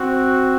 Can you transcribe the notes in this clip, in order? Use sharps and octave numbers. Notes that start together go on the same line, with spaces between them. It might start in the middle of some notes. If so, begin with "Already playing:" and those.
Already playing: C4 F#4